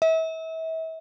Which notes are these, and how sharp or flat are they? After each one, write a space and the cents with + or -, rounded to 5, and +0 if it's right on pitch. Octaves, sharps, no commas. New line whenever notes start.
E5 -35